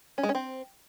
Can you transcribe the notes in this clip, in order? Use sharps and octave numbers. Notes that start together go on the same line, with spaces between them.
C#4
G#3
C#4
C4